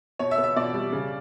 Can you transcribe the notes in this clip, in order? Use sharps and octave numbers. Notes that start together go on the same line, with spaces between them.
B2 C#5
E5
B3
E5
B2 D5
G3
C#3